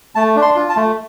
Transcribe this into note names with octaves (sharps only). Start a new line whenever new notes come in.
A3 A5
D4
C6
F4
A5
A3